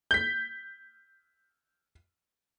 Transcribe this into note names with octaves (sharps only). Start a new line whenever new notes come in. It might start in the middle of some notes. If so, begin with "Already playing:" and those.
G6 B6